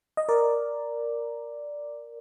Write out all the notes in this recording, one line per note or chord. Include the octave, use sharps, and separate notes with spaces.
D#5
A#4 D5